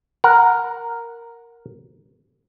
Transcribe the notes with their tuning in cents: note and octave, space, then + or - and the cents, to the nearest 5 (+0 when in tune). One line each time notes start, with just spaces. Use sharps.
A#4 +0 F#5 -10